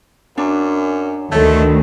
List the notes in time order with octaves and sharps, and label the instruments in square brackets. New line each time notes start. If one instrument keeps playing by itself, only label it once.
[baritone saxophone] F#2 [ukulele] D4
[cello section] D2 D#3 [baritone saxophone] A3 [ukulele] A4 C#5